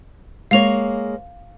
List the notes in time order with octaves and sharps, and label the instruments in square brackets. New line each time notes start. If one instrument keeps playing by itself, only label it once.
[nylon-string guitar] G#3 A#3 C#5 [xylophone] F5 F7